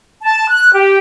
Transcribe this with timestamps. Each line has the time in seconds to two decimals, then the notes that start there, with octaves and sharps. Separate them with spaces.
0.23 A5
0.50 F#6
0.73 G4